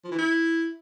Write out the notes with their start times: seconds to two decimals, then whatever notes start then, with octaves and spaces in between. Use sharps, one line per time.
0.04 F3
0.11 E3
0.19 E4